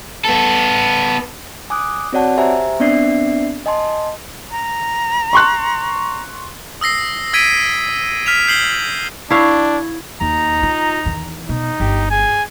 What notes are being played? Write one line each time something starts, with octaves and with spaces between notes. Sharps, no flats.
B3 A4
G#5 D6 D#6 F#6
C4 F#4 C#5 D5 F#5 A5
G4 C5 E5 G#5 A#5
B3 C4 D4 D5 E5 C7
D#5 G#5 A5 C6
A#5
C6 C#6 F#6
D#6 E6 A#6 C7
E6 G#6 B6 D7 D#7
F6 B6 E7 F7
G6 C7 F#7 G7
D4 E4 C#5 F5
D#2 D#4 A#5
F4
E2 D#3
B2 D#4
G1 G4
G#4 G#5